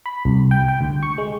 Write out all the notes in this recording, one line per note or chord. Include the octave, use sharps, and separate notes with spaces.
B5
C2
G5
G5
D2
C#6
G#3